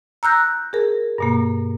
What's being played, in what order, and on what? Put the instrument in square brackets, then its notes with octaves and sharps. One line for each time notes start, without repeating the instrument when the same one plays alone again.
[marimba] A#5 E6 F#6 G6 A#6
G#4 A#4
G2 B2 A#3